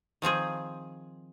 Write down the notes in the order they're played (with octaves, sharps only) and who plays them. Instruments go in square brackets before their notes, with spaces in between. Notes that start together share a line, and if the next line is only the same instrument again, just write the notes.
[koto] D#3 F3 C4 G#4